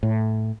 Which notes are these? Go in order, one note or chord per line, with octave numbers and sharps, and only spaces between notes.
A2